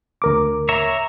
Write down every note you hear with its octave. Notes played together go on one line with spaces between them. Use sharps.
D2 A#4 D6
C#5 E5 A#5